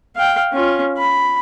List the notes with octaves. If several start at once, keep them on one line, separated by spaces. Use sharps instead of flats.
F5 G5
C#4 F4
B5